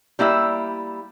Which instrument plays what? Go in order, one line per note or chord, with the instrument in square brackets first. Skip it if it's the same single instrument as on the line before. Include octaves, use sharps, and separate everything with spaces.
[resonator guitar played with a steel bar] G3 A#3 E4 E5